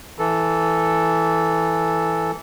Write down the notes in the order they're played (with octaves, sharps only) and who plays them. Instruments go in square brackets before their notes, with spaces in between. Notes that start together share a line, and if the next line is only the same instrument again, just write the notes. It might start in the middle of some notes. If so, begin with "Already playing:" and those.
[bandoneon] E3 A4